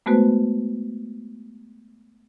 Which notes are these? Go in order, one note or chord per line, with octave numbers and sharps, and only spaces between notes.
G#3 A3 B3 F#4 B4 C5